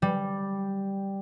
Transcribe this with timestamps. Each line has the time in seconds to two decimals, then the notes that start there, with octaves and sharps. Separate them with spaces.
0.02 G3